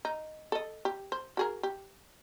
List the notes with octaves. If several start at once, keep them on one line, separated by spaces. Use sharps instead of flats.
D#4
A4 D#5
G4
C5
F#4 G#4 A#4
G4